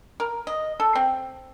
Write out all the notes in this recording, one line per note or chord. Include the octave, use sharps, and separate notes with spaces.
A#4
D#5
A4
C4